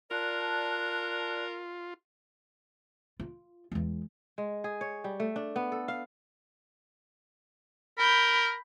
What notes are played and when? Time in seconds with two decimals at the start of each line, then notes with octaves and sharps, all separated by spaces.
0.11 F4 A#4 D5 A5 F#6
3.20 F4
3.72 E2 G#3
4.38 G#3
4.64 G#4
4.81 C#5
5.04 G3
5.20 A3
5.36 D4
5.56 B3
5.72 A4
5.88 F5
7.98 A#4 B5 G6